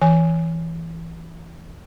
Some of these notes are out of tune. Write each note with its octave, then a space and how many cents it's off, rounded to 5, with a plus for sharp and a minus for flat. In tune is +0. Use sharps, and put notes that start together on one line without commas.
E3 +0 G#5 +0